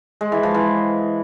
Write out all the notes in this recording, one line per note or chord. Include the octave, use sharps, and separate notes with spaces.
G#3
E3
F3
E3